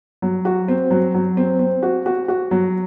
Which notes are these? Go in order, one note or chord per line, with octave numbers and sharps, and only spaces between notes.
F#3
F#4
C4
F#3
F#3
C4
C4
F#4
F#4
F#4
F#3